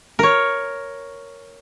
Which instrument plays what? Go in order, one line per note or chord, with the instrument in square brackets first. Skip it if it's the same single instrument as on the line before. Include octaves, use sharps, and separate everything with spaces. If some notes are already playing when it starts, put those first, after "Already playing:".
[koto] A#4 C#5